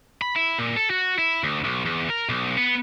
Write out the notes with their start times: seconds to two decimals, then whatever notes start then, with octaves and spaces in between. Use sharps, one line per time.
0.22 B5
0.36 E4
0.59 A#2
0.76 A4
0.90 F#4
1.18 E4
1.43 D2
1.65 B1
1.86 E2
2.10 A#4
2.29 B1
2.57 B3